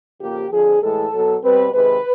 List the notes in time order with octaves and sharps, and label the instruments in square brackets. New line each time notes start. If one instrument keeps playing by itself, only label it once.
[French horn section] F2 C#3 F3 A#3 G4
F2 D3 F3 G#4
A2 E3 G#3 A4
B2 F#3 B3
B2 G3 C4 B4
C3 D#3 G#3 B4